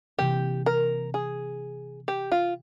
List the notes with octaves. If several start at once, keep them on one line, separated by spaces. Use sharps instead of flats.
C3 E3 A#3 G4
A#4
G#4
G4
F4